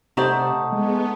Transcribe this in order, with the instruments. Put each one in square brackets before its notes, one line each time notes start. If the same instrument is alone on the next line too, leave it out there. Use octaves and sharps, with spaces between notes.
[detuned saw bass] C3 [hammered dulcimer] A3 D#4 F#4 [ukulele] G4 C5 D5
[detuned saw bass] G#3 [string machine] B3